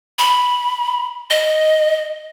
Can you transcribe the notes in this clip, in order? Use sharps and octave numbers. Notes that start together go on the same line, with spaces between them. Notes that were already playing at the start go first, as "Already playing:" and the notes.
B5
D#5